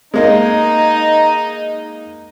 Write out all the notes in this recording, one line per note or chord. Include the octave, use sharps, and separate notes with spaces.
G#3 A#3 D#4 D#5